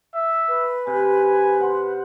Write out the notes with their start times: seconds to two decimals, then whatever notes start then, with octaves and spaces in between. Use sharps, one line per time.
0.14 E5
0.48 B4
0.87 C3 G#5
1.61 C5 F#5